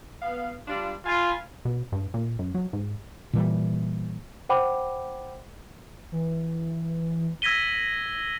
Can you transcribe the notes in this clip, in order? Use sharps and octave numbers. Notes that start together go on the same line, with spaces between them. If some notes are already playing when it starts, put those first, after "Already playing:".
B3 F5
G3 D4 F4
F4 F5 G#5 B5
B2
G2
A#2
F#2
F#3
G#2
A#2 E3 G3
C5 F#5 G5 B5 D6
E3
E6 G#6 A#6 B6 D#7 G7